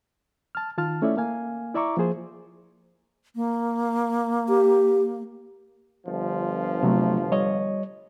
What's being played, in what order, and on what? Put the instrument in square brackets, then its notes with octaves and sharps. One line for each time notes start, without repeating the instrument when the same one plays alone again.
[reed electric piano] A5 F6
D#3 F4 A5 F6
A3 C#4 E4 A4 D5 E5
A#3 F5 G#5
E4 D5 E5 A#5 C#6 D6
F3 A#3 F4 G#4 C5
[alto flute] A#3
[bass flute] G4
[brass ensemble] G1 F3
[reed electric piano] C3 F#3 A3
G3 C#5 D#5